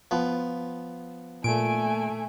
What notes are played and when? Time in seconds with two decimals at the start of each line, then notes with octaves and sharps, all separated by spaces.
0.11 F3 B3
1.44 A#2 A3 G#5 D7